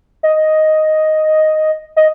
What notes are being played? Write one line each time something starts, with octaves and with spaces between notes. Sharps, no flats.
D#5
D#5